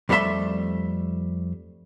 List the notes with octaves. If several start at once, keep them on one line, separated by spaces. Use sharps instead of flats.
F2 G3 A3 C4 E5 C6